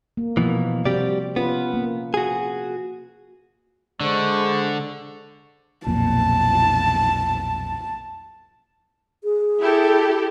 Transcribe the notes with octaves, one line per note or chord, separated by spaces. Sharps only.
A#3
B2 E3 F3 A#3
C3 G3 C4 F#4 G4 D5
B3 C#4 F4 B4
A#3
F#4 G#4
D3 G#3 C5 C#6
B1 F2 A#2 A5
G#4
E4 G4 A4